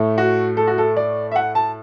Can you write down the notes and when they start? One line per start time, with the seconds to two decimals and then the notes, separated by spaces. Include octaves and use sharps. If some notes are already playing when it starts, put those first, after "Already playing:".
Already playing: A2 A3
0.18 F#4
0.57 A4
0.67 F#4
0.78 A4
0.97 D5
1.32 E5
1.36 F#5
1.55 A5